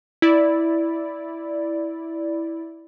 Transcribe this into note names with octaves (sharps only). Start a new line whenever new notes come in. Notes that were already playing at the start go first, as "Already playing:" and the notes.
E4 D5